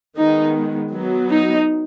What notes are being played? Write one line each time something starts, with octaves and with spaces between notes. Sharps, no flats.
D#3 G#3 B3 D#4
F#3 B3
D#4